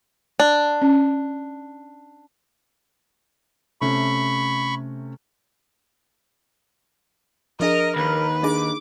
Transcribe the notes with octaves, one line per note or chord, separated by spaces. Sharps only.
D4
C#4
C3 A3 C#4 B5 C#6
F3 D4 G#4 A#4 D#5
D#2 B4
D4 D#4 G#4 D6